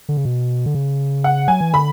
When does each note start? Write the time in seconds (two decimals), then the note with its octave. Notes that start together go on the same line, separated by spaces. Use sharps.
0.09 D3
0.17 C#3
0.25 B2
0.66 D3
0.75 C#3
1.24 F#5
1.48 F#3 G#5
1.61 E3
1.73 D3 B5